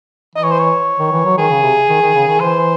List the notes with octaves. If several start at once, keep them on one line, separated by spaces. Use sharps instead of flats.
E3 D#5
C#5
C5
C#5
D#3
E3
F#3
D#3 G#4
C#3
C3
D#3
D#3
C#3
D#3
E3 C5